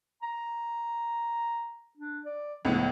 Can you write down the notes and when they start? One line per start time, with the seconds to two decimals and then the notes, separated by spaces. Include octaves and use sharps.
0.23 A#5
1.97 D4
2.25 D5
2.65 C#2 A2 F3 B3